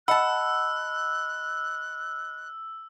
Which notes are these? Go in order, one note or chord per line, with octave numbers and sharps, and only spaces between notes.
D#5 F#5 A5 B5 E6 F#6